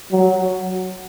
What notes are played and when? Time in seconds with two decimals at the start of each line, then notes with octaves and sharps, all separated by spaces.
0.12 F#3